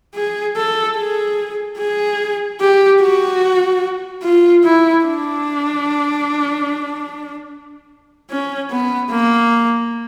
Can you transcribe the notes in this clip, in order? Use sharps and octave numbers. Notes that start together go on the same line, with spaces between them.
G#4
A4
G#4
G#4
G4
F#4
F4
E4
D4
C#4
B3
A#3